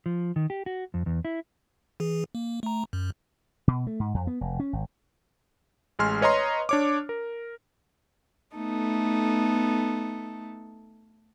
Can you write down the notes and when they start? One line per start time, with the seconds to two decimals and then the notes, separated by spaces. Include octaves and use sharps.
0.06 F3
0.36 D#3
0.50 G4
0.66 F#4
0.94 F2
1.06 E2
1.25 E4
2.00 E3 G#4
2.35 A#3
2.63 A3 A#5
2.93 F#2
3.68 B2
3.87 A3
4.00 G#2
4.14 F2
4.27 B3
4.41 F1
4.59 C#4
4.73 G#1
5.99 A1 G#3 G#5 C6 F6
6.21 B4 C#5 D#5 A#5 C6
6.69 D4 C#5 D6
7.09 A#4
8.56 A3 B3 D#4 A4